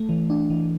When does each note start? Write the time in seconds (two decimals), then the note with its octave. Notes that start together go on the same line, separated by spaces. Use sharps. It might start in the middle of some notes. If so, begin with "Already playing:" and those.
Already playing: A3
0.09 E3
0.30 D4
0.50 E3